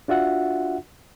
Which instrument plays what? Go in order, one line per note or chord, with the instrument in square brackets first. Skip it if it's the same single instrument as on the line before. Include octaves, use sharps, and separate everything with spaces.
[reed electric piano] D4 F4 F#4 E5 F#5